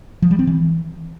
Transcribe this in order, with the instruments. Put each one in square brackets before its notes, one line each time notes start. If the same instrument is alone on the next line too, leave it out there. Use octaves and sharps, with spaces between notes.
[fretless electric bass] F3
G3
C4
E3